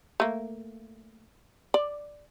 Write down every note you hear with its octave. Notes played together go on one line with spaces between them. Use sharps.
A3 A#3
D5